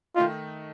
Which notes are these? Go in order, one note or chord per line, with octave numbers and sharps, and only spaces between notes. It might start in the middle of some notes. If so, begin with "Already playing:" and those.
D#3 A3 D#4 F4